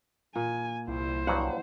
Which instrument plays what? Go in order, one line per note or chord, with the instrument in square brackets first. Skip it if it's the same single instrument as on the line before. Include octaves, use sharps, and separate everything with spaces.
[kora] A#2 [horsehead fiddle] G#5
[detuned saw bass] C2 [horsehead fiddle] E4 C5
[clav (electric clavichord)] G2 F3 F#3 [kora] F#5